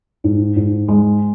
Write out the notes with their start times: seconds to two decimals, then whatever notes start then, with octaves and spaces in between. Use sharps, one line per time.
0.24 G#2
0.56 G#2
0.88 G#3